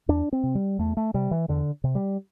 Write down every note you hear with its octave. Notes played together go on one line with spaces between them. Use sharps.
E2 D4
C4
C3
G3
E2 A3
A3
C3 G3
E3
E2 D3
C3
G3